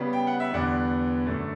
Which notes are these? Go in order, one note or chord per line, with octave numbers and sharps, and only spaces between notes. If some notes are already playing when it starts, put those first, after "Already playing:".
Already playing: C#3 G3 B3
G5
F#5
E5
E2 D3 G3 B3 D5 F#5
F#2 D3 A3